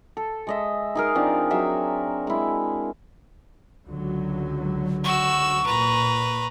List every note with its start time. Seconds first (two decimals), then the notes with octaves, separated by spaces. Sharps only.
0.17 A4
0.47 G#3 D#5 E5
0.95 D#4 G#4 A#4
1.15 F3 C4 D4 D#4
1.51 F#3 G#4 E5
2.27 G#3 E4
3.86 C#2 D3 F#3
5.05 F#4 C#6 E6
5.66 A#2 B4 A#5